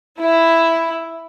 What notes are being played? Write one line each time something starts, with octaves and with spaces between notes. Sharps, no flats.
E4